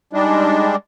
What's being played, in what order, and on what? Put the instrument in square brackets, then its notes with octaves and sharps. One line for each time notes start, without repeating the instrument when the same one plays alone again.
[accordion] G3 G#3 D4 [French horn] D#4